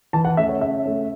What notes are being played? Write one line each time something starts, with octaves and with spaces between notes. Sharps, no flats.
E3 A5
F#5
A3 C#4 E5
C#5
C#3 E5
A3 C#4